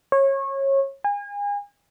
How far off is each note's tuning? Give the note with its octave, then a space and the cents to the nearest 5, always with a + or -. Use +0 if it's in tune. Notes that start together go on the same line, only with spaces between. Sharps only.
C#5 -25
G#5 -35